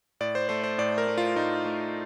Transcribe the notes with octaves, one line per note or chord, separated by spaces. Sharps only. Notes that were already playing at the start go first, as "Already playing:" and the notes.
A2 D5
C5
A3 C5
C5
A2 D5
A#4
A3
F4
A2 D#4
A3